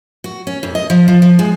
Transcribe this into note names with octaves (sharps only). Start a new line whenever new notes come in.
F#4
C#4
F2
D#5
F3
F3
F3
G#3